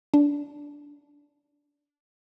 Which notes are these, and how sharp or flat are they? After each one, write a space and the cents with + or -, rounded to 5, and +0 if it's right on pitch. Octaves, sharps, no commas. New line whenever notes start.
D4 -15